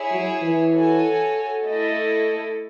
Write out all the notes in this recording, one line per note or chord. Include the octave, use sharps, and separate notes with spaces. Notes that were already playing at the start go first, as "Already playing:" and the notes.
Already playing: E4 G#4 C#5 E5 G#5
F#3
E3
F#4 A4 C#5 G#5
A3 E4 A4 D#5